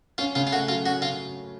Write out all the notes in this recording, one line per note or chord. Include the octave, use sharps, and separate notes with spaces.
C#4 F4
C#3 F4
F4
A3 F#4
F#3 F4
C#4 F#4
C#3 F4